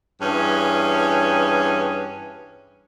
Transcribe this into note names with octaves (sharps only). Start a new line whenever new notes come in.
G2 E3 C#4 G#4